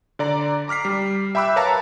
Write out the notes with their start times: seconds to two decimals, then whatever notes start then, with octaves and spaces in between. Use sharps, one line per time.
0.19 D3 D5 A#5
0.68 A#5 D6 F6 B6 C7
0.85 G3
1.35 E5 G5 B5 D6 E6 F#6
1.56 A#4 B4 C#5 F5 A5 A#5